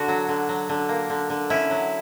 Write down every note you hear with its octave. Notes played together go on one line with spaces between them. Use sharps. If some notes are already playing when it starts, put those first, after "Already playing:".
Already playing: D3 F#4
F#3
D3
F#3
D3
A#3
D3
D3
C#4 E4
F#3